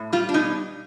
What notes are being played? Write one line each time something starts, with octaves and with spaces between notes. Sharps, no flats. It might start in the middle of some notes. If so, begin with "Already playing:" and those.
Already playing: A2
G3 F4
D4
B2 D#4